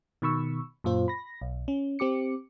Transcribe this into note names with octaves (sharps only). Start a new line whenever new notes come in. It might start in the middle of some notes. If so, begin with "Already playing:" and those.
B2 D#3 B5 C#6 E6
F#2 A#2 F4 C5
B5 A#6
B1
C#4
C4 G4 D6 C#7